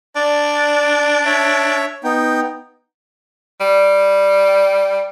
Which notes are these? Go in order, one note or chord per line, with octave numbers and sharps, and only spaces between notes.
D4 D5
C#5 E5
B3 D#4 G5
G3